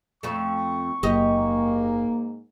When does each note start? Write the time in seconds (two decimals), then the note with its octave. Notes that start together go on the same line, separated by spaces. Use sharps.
0.23 F2 A3 C#6
1.03 F#1 G#2 A#3 G4 D#5